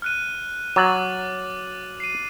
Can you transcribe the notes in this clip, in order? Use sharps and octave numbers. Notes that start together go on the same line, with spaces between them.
F6 F#6 D#7
F#3 D6 A6 F#7
C7 D#7